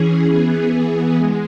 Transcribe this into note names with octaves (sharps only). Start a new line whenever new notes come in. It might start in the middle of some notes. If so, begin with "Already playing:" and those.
Already playing: E3 C#4 G#4
E3 B3 G#4
G#3